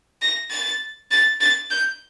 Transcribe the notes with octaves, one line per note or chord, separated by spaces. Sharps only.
A#6
A6
A6
A6
G6